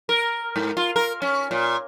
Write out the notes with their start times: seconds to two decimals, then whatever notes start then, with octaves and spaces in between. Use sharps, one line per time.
0.09 A#4
0.56 G#2
0.77 F4
0.96 A#4
1.22 C#4
1.51 A#2